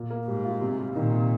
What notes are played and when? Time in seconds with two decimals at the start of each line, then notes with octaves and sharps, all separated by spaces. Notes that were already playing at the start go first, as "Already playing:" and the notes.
Already playing: A#2
0.10 A#3
0.27 G#2 G3
0.45 F4
0.61 C3
0.78 G3
0.95 A#2 D#3
1.12 C3